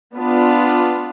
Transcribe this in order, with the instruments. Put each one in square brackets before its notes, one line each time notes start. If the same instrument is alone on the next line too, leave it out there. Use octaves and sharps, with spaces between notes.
[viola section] B3 D4 F4